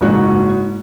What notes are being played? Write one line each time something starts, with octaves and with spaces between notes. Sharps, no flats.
F#1 G#2 F#4